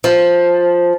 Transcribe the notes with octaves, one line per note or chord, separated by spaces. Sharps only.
F3